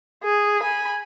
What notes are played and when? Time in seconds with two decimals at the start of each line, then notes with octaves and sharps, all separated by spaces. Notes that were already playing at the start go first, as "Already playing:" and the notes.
0.23 G#4
0.61 G#5 B5